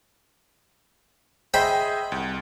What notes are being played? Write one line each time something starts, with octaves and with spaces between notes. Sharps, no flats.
G#4 C5 D#5 E5 G5 B5
C2